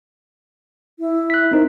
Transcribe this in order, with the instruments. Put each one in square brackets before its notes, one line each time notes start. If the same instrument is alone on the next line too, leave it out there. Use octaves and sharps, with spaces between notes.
[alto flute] E4
[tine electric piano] F#6 B6
[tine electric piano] C4 D#4 C5 [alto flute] A#4